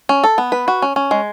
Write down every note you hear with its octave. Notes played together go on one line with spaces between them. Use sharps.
C#4
A4
B3
B4
F#4
C#4
C#4
G#3